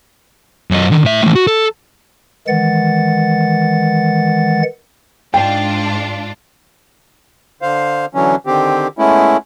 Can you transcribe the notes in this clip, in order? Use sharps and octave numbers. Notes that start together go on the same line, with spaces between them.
F#2 D#5
D3 D#3
A2 E5
A2 E3
F#4
A4
D#3 E3 G#3 F#5 A6
G#2 D4 F4 G5
D3 C5 F5
D3 E3 F#3 C#4
D3 D#3 C4 G4
G#3 A3 B3 C#4 E4